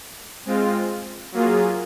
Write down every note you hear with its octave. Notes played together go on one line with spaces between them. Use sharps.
G#3 C4 F4
F#3 A#3 F4 G#4